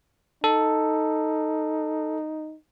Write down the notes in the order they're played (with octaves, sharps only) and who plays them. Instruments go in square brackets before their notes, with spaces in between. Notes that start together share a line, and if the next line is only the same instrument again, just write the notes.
[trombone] D#4 [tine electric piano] A4